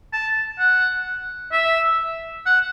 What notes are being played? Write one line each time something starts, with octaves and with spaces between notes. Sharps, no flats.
A5
F#5
E5
F#5